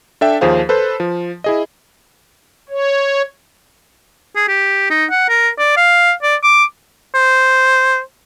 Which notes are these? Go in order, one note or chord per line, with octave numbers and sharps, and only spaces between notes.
D4 A4 E5 G5
D#2 F3 G#4 C5 F5
A4 B4 C5
F3
E4 G#4 D#5
C#5
G#4
G4
D#4
F#5
A#4
D5
F5
D5
D6
C5